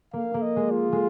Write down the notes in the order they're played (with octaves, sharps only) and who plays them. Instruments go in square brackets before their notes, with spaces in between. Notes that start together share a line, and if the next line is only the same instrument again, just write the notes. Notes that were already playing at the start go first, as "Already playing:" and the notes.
[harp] A#3 [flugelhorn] F5
[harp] A#3
[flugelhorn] D#5
[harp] G#3
[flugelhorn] F4
[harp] G#3